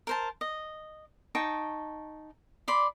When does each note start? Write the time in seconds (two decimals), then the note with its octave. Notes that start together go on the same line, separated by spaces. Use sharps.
0.07 A#4 C5 A5
0.41 D#5
1.35 D#4 G5 A5 C#6
2.68 D5 B5 C6